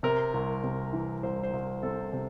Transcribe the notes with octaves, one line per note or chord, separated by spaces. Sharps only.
C3 A#4
C2
C3
E3
C2 C5
C5
C2
C3 A4
C3